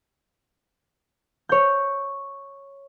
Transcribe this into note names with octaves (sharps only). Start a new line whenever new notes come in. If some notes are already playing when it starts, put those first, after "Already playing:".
C#5 G6